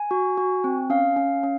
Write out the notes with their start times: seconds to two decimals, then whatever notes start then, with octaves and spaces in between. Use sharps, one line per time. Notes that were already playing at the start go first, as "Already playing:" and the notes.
Already playing: G#5
0.11 F#4
0.37 F#4
0.64 C4
0.90 C#4 F5
1.16 C#4
1.43 C#4